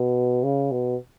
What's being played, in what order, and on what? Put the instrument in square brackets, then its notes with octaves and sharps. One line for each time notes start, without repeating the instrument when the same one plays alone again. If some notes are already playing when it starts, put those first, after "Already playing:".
Already playing: [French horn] B2
C#3
B2